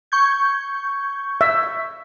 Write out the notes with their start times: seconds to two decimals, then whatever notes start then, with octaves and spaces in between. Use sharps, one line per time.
0.12 C#6 G6 G#6
1.41 E5